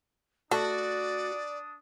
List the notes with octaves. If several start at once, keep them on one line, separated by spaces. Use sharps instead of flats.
A3 D4 F#4 A4 D5 D#6